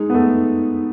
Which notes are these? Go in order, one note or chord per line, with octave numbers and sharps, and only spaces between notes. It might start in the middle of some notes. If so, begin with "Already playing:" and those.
Already playing: G#3 D#4
B3
A3